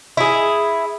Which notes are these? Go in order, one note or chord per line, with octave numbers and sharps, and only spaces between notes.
E4 G#4